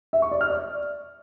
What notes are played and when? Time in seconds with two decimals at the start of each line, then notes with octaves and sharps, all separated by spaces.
0.13 E5
0.22 C#6
0.31 D5
0.41 F6
0.50 D5